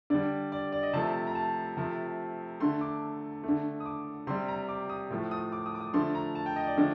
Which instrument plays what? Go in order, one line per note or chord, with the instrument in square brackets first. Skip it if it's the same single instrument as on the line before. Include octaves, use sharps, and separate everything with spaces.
[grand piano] D3 G3 D5
D5
D5
D#5
C3 F3 A3 A5
A#5
A5
C3 F3 A3
D3 A3 C6
D6
D3 A3
D#6
D6
C3 G3 C6
A#5
D6
D#6
A2 F3 A3
D#6
D6
D#6
D6
D#6
D3 F3 A3 C6
A#5
A5
G5
D#5
D5
D3 F3 A3 D5